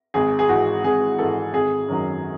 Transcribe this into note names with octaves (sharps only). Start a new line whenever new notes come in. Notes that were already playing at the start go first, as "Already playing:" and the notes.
G#1 G#4
G#4
G#2 E3 F#4
G#1 G#4
G#2 E3 A4
G#1 G#4
F#2 D#3 F#3